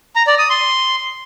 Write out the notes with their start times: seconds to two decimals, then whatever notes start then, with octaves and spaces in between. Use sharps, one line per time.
0.16 A#5
0.27 D5
0.39 D#6
0.50 C6